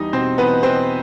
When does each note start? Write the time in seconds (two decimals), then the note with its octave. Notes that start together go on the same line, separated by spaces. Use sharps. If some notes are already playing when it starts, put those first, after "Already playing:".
Already playing: E2 G3 D#4 D#5
0.13 B2 C4 C5
0.38 E2 B3 B4
0.63 E2 C4 C5